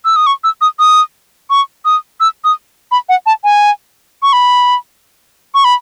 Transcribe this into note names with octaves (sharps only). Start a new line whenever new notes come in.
E6
D#6
C#6
E6
D#6
D#6
C#6
D#6
E6
D#6
B5
F#5
A5
G#5
C#6
B5
C#6
B5